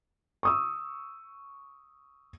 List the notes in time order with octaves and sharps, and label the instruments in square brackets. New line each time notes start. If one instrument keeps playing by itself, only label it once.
[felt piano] C#6 D#6 E6